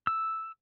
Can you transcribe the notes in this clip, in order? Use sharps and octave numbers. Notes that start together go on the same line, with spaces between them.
E6